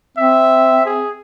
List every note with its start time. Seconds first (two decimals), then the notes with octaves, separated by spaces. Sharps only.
0.17 C4 E5
0.85 G#4